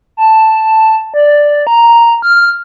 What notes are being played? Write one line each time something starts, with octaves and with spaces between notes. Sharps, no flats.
A5
D5
A#5
F6